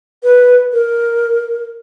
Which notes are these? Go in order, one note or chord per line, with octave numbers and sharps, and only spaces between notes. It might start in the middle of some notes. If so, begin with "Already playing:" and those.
B4
A#4